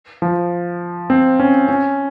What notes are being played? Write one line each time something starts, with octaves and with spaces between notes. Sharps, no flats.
F3
C4
C#4
C#4